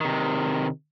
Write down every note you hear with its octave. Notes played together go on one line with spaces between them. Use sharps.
C3 D#3